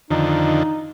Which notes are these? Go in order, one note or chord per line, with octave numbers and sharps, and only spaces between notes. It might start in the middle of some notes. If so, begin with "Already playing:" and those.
F2 D3 D#3 D#4